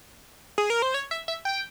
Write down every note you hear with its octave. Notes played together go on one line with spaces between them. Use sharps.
G#4
A#4
C5
C#5
E5
E5
G5